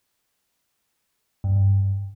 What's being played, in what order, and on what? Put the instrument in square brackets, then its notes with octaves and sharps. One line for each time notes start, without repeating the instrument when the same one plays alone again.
[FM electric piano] G2